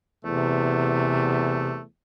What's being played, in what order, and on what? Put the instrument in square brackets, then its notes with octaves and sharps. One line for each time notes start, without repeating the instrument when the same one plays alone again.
[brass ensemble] E2 E3 [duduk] C3 [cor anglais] A3